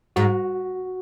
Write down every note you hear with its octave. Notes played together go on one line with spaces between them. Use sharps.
G#2 F#4